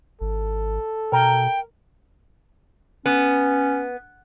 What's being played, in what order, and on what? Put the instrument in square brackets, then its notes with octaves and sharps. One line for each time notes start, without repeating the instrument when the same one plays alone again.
[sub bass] G#1 [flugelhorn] A4
[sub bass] B2 [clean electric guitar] A#4 [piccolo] G5
[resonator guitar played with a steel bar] B3 [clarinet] C#4